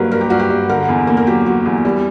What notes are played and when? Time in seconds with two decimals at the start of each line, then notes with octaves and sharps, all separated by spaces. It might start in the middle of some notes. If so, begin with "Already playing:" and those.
Already playing: G2 F#3 A#3 A#4 B4
0.11 G2 A#4
0.21 G4
0.30 G2 F#4
0.39 G4
0.50 G2
0.69 D3 A#4
0.88 E2
1.07 A#3
1.17 A#4
1.27 F#3 G4
1.46 F#3
1.66 E2
1.85 G3